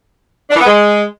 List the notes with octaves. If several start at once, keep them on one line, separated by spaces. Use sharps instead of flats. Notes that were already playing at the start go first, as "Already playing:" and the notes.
D4
E3
B3
G#3